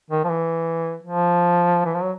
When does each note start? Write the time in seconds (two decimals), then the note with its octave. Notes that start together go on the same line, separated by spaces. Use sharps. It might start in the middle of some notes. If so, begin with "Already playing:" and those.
0.11 D#3
0.24 F3
0.29 E3
1.03 F3
1.86 E3
1.94 F3
2.03 F#3